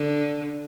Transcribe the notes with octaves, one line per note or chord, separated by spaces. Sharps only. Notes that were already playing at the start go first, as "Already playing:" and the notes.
Already playing: D3